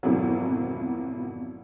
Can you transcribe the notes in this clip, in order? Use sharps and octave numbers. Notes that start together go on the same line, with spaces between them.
G#1 F2 B2 E3 F#3